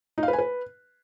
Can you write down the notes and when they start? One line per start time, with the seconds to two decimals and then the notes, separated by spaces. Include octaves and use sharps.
0.18 D#4
0.23 F5
0.28 B4
0.33 G#5
0.39 B4